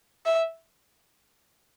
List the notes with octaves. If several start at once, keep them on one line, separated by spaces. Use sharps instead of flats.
E5